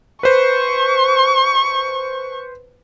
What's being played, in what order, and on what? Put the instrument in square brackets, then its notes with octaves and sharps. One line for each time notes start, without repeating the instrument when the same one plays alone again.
[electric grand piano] B4 C5 [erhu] C#6